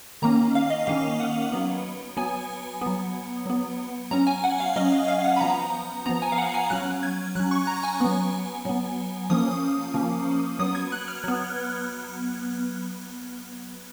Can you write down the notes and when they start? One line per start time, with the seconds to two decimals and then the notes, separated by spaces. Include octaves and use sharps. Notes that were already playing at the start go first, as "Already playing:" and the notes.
0.22 D#3 A#3 C#4 A#5
0.55 F5
0.70 D#5
0.87 D#3 A#3 C#4 F5
1.20 F#5
1.52 F#3 B3
2.17 F#3 B3 G#5
2.81 F#3 B3
3.46 F#3 B3
4.11 F#3 C#4 A#5
4.27 G#5
4.44 F#5
4.60 F5
4.76 F#3 C#4 D#5
4.92 F5
5.08 F5
5.25 F#5
5.36 B5
5.41 F3 B3 A#5
6.06 F3 B3 A#5
6.22 G#5
6.32 F5
6.38 F#5
6.54 G#5
6.70 F#3 C#4 F#6
7.03 G#6
7.35 F#3 F#6
7.40 C#4
7.51 C#6
7.67 A#5
7.83 G#5
8.01 F#3 B3
8.65 F#3 B3
9.30 F3 A#3 C#4 D#6
9.94 F3 A#3 C#4
10.59 F#3 B3 D#6
10.75 G#6
10.92 F#6
11.08 F6
11.24 F#3 B3